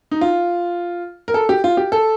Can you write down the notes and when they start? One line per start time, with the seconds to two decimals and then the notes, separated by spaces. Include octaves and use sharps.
0.11 D#4
0.21 F4
1.28 A#4
1.34 A4
1.49 G4
1.64 F4
1.77 G4
1.92 A4